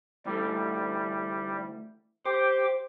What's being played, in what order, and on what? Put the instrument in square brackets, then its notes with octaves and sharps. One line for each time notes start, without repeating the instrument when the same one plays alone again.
[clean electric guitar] D2 E3 A3 [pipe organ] G3
[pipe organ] G4 G5 D6 [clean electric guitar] C5